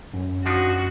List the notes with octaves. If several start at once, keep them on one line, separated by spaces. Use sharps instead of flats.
F#2
F3 D4 D#4 F#4